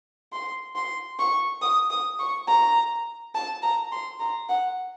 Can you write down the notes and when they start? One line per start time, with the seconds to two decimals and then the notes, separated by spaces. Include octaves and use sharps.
0.32 C6
0.76 C6
1.19 C#6
1.62 D#6
1.91 D#6
2.19 C#6
2.47 A#5
3.35 A5
3.62 A#5
3.92 C6
4.20 A#5
4.49 F#5